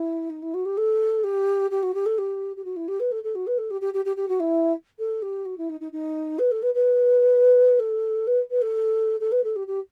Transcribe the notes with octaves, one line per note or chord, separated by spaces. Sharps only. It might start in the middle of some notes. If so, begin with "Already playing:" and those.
Already playing: E4
D#4
E4
F#4
G4
A4
G4
G4
F#4
G4
A4
G4
G4
F#4
E4
G4
B4
A4
A4
F#4
B4
A4
G4
G4
G4
G4
G4
F#4
E4
A4
G4
F#4
E4
D#4
D#4
D#4
B4
A4
B4
B4
A4
B4
B4
A4
A4
B4
A4
G4
G4